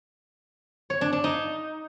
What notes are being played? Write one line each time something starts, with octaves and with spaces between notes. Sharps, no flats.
C#5
D4
D4
D#4